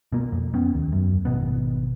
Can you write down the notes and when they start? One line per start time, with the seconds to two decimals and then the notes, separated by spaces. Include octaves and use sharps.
0.12 B2 A#3
0.32 F2
0.54 B3 C#4
0.74 D#2
0.92 F#2
1.25 G#1 B2 B3